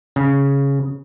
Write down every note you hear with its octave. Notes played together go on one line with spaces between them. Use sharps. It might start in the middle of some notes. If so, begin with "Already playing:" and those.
C#3